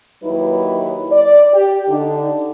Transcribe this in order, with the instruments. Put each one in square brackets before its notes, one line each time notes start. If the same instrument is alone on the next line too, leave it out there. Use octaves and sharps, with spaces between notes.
[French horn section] D#2 F#3 D#4 E4 B4
D5
G4
D3 D4 D#4